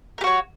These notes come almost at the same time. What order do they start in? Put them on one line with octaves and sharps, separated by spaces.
A#4 G4 F#4 C#5